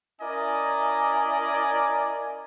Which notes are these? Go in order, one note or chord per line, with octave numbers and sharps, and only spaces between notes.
C#4 E4 A#4 D5 D#5 G#5